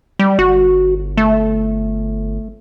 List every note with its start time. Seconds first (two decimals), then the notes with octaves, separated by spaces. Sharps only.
0.19 G3
0.39 G1 F#4
1.17 A3